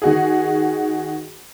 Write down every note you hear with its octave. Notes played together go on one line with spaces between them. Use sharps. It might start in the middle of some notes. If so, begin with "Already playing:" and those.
D#3 F#4 G#4